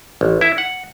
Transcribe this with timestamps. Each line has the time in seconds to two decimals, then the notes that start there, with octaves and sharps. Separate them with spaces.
0.21 A1
0.41 E4 E5
0.58 F#5